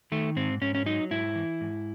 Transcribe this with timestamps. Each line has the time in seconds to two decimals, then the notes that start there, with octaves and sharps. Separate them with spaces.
0.12 D#3 A3
0.36 G#2 C4
0.61 G#2 C#4
0.75 C#4
0.86 F#3 D#4
1.11 G#2 E4
1.35 E3
1.61 G#2